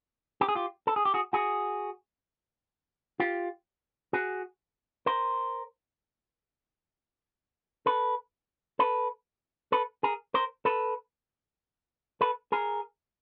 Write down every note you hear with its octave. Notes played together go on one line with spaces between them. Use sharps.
G4
G#4
F4 G4
A4
G#4
G4
F#4 G#4
F#4 G#4
F4 G4
F#4 G#4
A#4 C5
A4 B4
A4 B4
A4 B4
G#4 A#4
A#4 C5
A4 B4
A4 B4
G#4 A#4